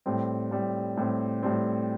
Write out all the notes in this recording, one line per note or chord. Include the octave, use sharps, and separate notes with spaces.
A2 G3 C4
A2 G3 C4
A2 G3 C4
A2 G3 C4